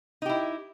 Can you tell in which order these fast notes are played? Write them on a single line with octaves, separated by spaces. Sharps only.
D#4 G4 E4